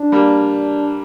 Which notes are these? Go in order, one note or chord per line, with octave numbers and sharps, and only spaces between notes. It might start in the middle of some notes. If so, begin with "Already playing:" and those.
Already playing: D4
G3 A#3